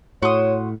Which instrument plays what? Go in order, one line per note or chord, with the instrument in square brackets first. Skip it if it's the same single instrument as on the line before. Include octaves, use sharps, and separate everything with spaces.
[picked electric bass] A2 [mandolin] F#4 C6 D#6 [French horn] C#5